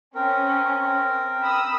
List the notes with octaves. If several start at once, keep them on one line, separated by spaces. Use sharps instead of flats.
C4 C#4 A#4
B5 D#6 E6